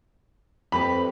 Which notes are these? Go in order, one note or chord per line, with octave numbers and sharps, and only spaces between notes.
F2 G4 B4 B5